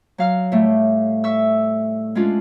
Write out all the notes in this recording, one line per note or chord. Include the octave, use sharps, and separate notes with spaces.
F#3 F5 F6
A2 G3 A3
E5 C#6 E6
G#3 C#4 D4 F4